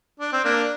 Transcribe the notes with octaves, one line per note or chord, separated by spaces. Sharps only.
D4
C4
A#3 D4